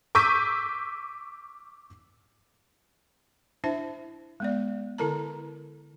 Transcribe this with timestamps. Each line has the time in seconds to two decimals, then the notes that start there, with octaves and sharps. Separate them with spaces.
0.15 C#6 D6 E6 G6 B6 D#7
3.64 D4 E4 C5 E5 A5
4.40 G#3 B3 D5
4.98 D3 E4 A4 A#4 A5 A#5